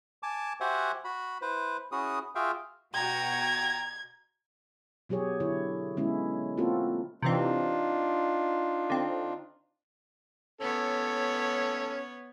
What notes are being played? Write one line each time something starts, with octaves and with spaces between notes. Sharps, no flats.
G#5 A5 D6
F#4 G4 C5 E5 F#5 G#5
F#4 B5
E4 B4 C5
C#4 E4 F#4 G#4 D#6
F4 F#4 G#4 E5 F5 G5
B2 F#4 G5 A#5 G#6
B2 F#3 G4 G#4 C#5
D3 E4 C#5
D3 G#3 B3 C#4 E4
A#3 C4 F4 F#4 A4
C3 E3 C4 D4 D#4 F4
D3 C4
B3 C#4 A4 C#5